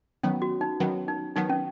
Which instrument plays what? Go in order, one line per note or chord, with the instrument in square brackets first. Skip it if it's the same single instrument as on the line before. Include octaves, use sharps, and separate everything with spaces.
[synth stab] D#3 F#3 B3 [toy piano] C#4
[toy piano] F#4
D#4
[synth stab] D#3 F#3 B3 [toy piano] C#4
[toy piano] D#4
[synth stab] D#3 F#3 B3 [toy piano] D#4
[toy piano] C#4